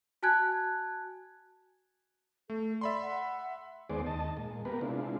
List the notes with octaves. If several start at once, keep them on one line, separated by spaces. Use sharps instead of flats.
F#4 G#5 A5 F#6 G#6
A3 A4
D5 E5 B5 C6
F#5
D#2 G#3 B3 G#4 C5 D5
D#2 D#5 A5
A#2 G#3
A#3 B3 G4 A#4 B4
C3 G#3 D4 E4 F4